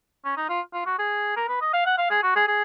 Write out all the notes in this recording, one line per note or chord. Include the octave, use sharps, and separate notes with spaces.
C#4
D#4
F4
F4
F#4
G#4
A#4
B4
D#5
F5
F#5
F5
G#4
F#4
G#4
G#4